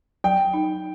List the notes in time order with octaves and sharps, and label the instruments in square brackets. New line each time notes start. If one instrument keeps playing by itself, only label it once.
[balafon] F#3 [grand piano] G5
[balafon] D#4